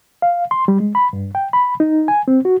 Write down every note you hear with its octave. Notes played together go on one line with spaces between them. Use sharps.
F5
C6
G3
G#3
B5
G2
G5
B5
D#4
G#5
C4
F#4